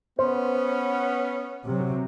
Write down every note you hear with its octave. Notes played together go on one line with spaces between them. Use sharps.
B3 C#4 C5
C3 F#3